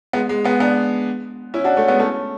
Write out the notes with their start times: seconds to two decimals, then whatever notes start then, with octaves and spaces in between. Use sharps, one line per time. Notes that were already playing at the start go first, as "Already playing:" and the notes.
0.13 G#3 B3
0.29 G#3
0.44 G#3 B3
0.60 B3 D4
1.54 C#4 E4
1.64 D4 F#4
1.76 A3 C#4
1.88 G#3 B3
1.99 A3 C#4